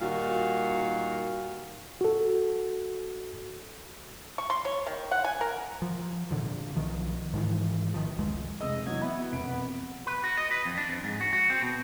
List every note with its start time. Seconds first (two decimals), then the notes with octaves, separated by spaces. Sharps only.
0.01 A#2 D#3 G3 F#4 F5
2.01 F#4 A4
4.38 C#6
4.50 C6
4.65 C#5
4.86 D#3
5.11 F#5
5.24 G#5
5.41 A#4
5.82 F3
6.31 A#2 D3 F3
6.76 B1 E2 D#3 F3
7.34 G#2 D#3 E3
7.94 A1 D#3 F3
8.17 F1 C#2 G#3
8.60 F1 G#3 D#5 E6
8.87 E3 F#3 G#6
9.02 B3 E5 B5
9.31 E1 F2 D7
10.07 B4
10.24 F#4
10.37 D#5
10.51 B4
10.65 F2
10.77 D4
10.90 F2
11.04 G#2
11.21 F#4
11.33 F#4
11.50 C4
11.62 B2